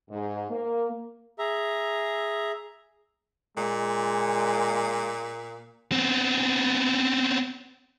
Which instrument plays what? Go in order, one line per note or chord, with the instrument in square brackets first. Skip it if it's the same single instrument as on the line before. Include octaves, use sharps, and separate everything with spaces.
[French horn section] G#2
A#3
[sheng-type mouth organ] G#4 E5 A#5
[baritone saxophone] A#2 [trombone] G#3
[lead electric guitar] B3 C4